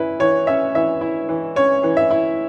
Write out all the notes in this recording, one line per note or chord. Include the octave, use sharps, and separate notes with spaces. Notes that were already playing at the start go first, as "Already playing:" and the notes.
Already playing: E3 C#4 E4 B4
E3 C#5
C#4 E5
E3 E5
E4
E3
C#4 C#5
E3
E5
E4